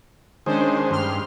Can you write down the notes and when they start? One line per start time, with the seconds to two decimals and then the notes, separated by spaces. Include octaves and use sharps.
0.46 D#3 G#3 C#4 D4 C5
0.91 G2 C6 F6